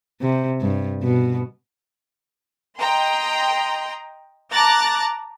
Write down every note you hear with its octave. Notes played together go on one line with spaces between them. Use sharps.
C3
G2
B2
D#5 G5 A#5 C6
A5 A#5 D6 F#6 A6 A#6